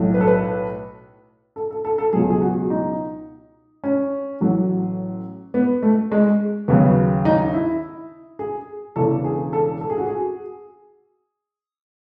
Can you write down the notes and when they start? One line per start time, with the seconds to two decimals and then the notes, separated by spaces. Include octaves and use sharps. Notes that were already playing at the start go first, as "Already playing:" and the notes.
Already playing: B1 A2 F#3
0.14 B4
0.21 A4
0.28 B4
1.56 A4
1.71 A4
1.85 A4
1.98 A4
2.13 C#2 B2 F#3 G#4
2.30 G#4
2.42 F#4
2.70 D#4
3.84 C#4
4.41 A1 A2 F#3
5.54 B3
5.82 A3
6.12 G#3
6.68 D#2 C#3 F#3 B3
7.25 D#4
7.54 E4
8.39 G#4
8.96 E1 E2 C#3 E3 A4
9.24 G#4
9.53 A4
9.81 A4
9.90 G#4
9.98 F#4
10.06 G#4